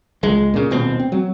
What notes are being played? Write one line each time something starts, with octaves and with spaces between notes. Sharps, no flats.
C#2 G#3
A#2 C#3
D#1 B2 C4
C4
F#3